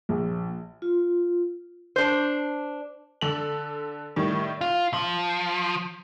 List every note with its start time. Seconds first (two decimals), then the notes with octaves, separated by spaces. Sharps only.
0.09 A#1
0.82 F4
1.96 D4 C5
3.21 D3 A4 F#7
4.16 A2 D#3 G3
4.61 F4
4.94 F3